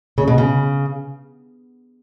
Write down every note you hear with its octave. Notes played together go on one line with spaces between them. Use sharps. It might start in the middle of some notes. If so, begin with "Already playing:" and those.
C#3
B2
C#3